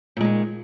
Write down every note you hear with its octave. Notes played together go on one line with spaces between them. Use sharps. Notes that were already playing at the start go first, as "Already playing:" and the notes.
A#2 D#3 G#3